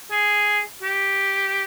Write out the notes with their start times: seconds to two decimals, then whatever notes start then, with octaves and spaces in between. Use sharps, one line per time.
0.11 G#4
0.82 G4